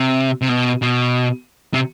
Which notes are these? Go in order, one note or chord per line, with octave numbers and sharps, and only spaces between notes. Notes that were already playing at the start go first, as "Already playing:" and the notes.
Already playing: C3
C3
B2
B2
C3